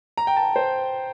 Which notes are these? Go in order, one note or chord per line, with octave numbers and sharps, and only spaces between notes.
A#5
G5
A5
C5